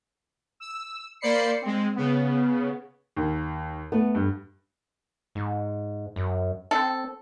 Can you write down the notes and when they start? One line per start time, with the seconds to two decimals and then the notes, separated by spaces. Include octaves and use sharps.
0.60 E6
1.21 A#3 C5 D5 B5 C7 C#7
1.62 G#3 C4
1.95 C#3 B3
3.16 D#2
3.92 A3 B3
4.15 G2
5.35 G#2
6.16 F#2
6.71 C4 A4